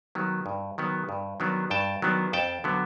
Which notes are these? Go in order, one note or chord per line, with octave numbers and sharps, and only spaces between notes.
D#3 F#3 B3
G2
D#3 F#3 B3
G2
D#3 F#3 B3 D4
G2 G5 A5
D#3 F#3 B3 D4
F2 G5 A5
D3 F#3 B3